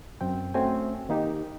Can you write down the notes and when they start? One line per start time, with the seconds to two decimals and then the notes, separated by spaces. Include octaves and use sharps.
0.21 F#2 C4 G5
0.54 A3 C4 C#4 F#4 A4 G#5
1.09 D#3 A#3 D#4 G4